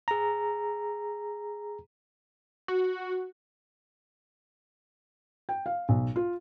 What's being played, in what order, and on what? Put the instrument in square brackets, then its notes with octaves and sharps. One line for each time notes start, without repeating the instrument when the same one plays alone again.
[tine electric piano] G#4 A#5
[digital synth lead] F#4
[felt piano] G5
F5
B1
F4